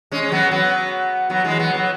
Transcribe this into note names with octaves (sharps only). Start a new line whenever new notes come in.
G#3 C#4
C#4
F#3 B3
F#3 B3
F#3 B3
E3 G#3
F#3 B3
F#3 B3